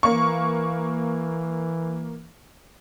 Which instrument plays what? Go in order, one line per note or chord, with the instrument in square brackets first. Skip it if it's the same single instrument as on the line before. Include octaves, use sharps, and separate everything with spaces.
[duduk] E3 [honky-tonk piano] A#3 C#6